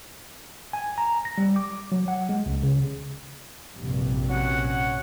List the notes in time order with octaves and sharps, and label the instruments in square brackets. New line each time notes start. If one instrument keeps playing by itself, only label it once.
[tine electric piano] G#5
A#5
A#6
G3
D6
F#3
F#5
G#3
C#2
C#3
[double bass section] A#1 G2 C3
[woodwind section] C#4 F#4 F#5